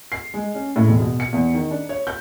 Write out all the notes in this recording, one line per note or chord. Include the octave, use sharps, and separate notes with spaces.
C7
G#3
C#4
A2
E1
B2
C#7
E2
D#3
D4
C#5
G6